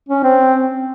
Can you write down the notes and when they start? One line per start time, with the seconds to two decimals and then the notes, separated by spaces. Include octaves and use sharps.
0.09 C#4
0.24 C4